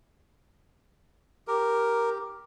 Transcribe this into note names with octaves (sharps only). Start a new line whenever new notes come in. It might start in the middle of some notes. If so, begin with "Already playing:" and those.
G4 A#4